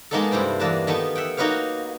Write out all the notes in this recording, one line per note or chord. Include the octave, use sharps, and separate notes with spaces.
G#3 A#3 B3 D#4 G#4 A4
G2 C3 E4 C5 G5
E2 A#3 D4 B4 E5 A5
D#3 A3 B3 D#4
E5 F#5 G5
A#3 D#4 F#4 B4 C#5 F5